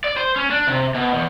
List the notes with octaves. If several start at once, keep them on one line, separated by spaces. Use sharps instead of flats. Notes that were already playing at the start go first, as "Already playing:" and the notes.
D5
C5
C#4
D4
C3
B2
E2